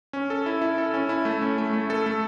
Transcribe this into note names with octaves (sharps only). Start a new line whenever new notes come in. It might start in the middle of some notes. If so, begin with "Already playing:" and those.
C#4
A4
E4
E4
A4
C#4
E4
A3
C#4
A3
A3
A4
A3